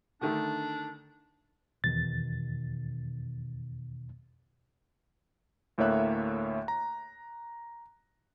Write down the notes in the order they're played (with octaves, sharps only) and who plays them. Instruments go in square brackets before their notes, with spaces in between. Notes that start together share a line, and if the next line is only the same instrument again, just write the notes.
[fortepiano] D3 D#3 A3 [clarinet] D4
[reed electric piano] E2 A6 [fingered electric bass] B2 D#3
[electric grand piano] D2 A2 A#3 C#5 E5 F#6
A#5